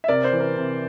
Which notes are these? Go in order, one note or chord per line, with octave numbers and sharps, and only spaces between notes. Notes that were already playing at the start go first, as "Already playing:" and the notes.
E5
C3 A#4 D5
C5
E3
A#4
C3